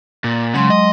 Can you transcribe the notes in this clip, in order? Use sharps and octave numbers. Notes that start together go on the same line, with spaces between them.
A#2
C#3 F#3 G#3 C6
D#5